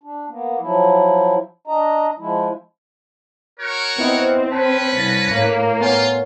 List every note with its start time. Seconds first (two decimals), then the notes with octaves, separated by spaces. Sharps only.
0.03 D4
0.28 A#3 B3
0.59 F3 F#3 E4
1.67 D4 D#5 A#5
2.18 F3 G#3 E4
3.60 F#4 A#4 C#5
3.99 B3 C4 E4 D#5
4.52 C#4 B4 A5
4.98 C2 A6 A#6
5.33 A2 A#3 C#5
5.81 B3 F4 C#5 G#5